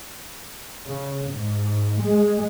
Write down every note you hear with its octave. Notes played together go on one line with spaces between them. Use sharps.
C#3
G#2
G#3